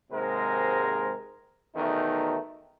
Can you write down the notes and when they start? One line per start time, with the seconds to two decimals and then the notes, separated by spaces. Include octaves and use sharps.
0.12 D#2 G#2 C3 G#3 A#4 C5
1.76 E2 B2 D#3 A3 D#4